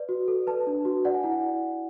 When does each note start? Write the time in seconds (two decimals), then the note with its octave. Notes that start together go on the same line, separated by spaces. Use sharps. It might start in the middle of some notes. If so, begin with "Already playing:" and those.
Already playing: B4 D5
0.09 F#4
0.28 A4
0.47 B4 A5
0.67 D4
0.85 F#4
1.05 D5 F#5
1.14 G#5
1.23 E4 F#5